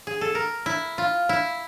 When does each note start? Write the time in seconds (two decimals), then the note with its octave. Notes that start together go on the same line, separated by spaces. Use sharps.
0.07 G#4
0.21 A4
0.35 A#4
0.66 E4
0.98 F4
1.29 E4